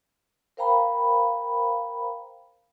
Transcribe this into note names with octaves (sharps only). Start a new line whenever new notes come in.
A#4 C5 F5 G5 A#5 B5